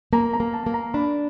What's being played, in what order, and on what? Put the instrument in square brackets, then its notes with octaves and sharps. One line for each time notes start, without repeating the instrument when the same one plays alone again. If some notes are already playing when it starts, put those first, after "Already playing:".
[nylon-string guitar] A#3 [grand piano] A#5
[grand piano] A#5
[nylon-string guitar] A#3
[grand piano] A5
[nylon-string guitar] A#3 [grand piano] A5
[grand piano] A#5
[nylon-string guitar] D4 [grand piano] B5